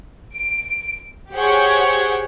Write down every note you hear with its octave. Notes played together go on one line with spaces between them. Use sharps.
D7
G4 G#4 C5 C#5 F#5 G5